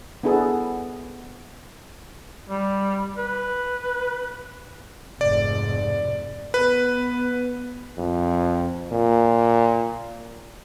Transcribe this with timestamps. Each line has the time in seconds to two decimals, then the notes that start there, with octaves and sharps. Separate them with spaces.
0.23 B3 D4 E4 G#4 A4
2.50 G3
3.17 B4
5.21 F1 G#2 D5
6.54 B3 B4
7.98 F2
8.92 A#2